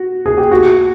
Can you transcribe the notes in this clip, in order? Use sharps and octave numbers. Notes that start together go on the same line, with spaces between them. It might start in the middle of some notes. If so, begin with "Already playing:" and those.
Already playing: F#4
G#4
G4
F#4